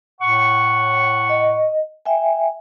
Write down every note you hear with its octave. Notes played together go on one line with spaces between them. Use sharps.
A2 F#5 C#6
D#5
E5 G5 G#5